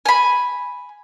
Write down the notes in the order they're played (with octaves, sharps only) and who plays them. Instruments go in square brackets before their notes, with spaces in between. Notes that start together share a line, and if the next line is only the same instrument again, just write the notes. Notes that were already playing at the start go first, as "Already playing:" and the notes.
[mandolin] G#5 B5